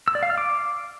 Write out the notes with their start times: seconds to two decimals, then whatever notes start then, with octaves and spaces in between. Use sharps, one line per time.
0.08 E6
0.15 D5
0.23 F5
0.30 F6
0.38 D6